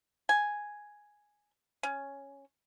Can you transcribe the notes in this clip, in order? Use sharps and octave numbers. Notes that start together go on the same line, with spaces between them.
G#5
C#4